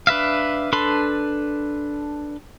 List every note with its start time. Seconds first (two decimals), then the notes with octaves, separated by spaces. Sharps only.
0.07 D4 B4 E5 F5
0.73 D4 A4 B4 B5 C6